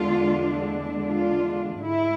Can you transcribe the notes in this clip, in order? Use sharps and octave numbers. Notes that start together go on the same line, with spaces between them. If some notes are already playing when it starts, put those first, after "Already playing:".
Already playing: E2 D3 G#3 D4 F4
F4
G#2 G#3 E4